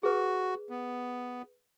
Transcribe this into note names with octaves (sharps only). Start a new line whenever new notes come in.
F#4 G#4 B4
B3